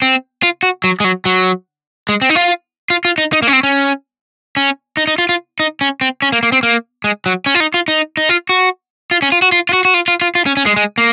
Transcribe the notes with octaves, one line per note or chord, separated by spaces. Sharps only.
C4
F4
F#4
F#3
G#3
F#3
F#3
G#3
C4
D#4
F4
F4
F4
D#4
D#4
A#3
C#4
C4
C#4
C#4
D#4
D#4
F4
F4
D#4
C#4
C4
C#4
A#3
A#3
C4
A#3
G#3
F#3
C#4
F4
D#4
F4
D#4
D#4
F4
F#4
F4
C#4
F4
F#4
F4
F4
F#4
F#4
F4
F4
F4
F4
C#4
C#4
G#3
G#3
A#3